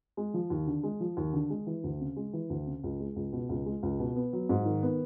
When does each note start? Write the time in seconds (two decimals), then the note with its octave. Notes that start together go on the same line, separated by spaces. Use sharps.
0.17 G#3
0.34 F3
0.50 D#2
0.67 D3
0.83 G#3
1.00 F3
1.17 D#2
1.33 D3
1.50 G#3
1.67 E3
1.84 D2
2.00 C#3
2.16 G#3
2.33 E3
2.50 D2
2.66 C#3
2.84 C#2
3.00 G#3
3.16 C#2
3.33 B2
3.49 C#2
3.66 G#3
3.83 C#2
3.99 B2
4.16 B3
4.33 F#3
4.49 G#2
4.66 D#3
4.83 B3